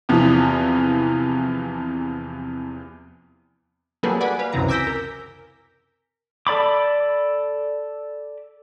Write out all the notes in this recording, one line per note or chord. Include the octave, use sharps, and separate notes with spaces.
E2 C3 E3 F3
F#3 G3 A#3 G#4 A4 B4
B4 D5 F#5 G#5 B5
B4 F5
C#2 F#2 C3 E3 A#5
G#5 D6 E6 G6 A#6 B6
A#4
A4 D5 B5 D6